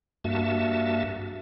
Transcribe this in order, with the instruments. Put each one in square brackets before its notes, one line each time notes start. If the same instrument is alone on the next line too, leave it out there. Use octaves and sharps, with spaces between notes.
[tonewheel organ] G2 A#3 F#4 E5 A5